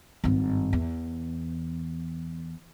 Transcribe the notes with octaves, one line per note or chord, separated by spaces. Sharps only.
G#1 G2
E2